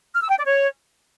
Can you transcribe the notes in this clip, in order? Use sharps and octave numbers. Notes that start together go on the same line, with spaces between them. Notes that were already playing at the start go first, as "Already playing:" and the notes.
F6
E6
G5
D5
C#5